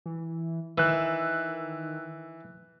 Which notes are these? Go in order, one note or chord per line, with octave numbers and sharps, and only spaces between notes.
E3
D#3 E3 E6 F#6